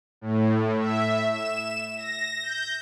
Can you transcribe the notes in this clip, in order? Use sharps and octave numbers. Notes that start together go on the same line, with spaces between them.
A2
E5
E7
A#6
G6